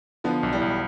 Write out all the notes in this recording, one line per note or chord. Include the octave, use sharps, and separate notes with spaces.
D3 F3 B3
B1
E3 G3
B1